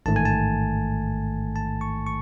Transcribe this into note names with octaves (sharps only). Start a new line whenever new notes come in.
A1 G#2 D#3 A3 A5
G#5
A5
A5
C#6
C#6